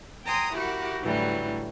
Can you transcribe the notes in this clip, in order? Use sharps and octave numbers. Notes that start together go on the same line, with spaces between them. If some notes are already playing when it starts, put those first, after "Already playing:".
G5 G#5 A#5 C6 D#6
E4 F#4 G4 A#4 F#5
A2 D3 E3 F#3 G3